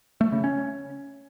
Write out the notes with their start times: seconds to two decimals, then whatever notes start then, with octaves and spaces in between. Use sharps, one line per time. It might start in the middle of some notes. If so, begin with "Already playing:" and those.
0.21 A3
0.32 C#3
0.44 C#4